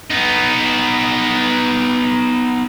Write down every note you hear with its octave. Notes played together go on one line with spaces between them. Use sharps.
B3 D#4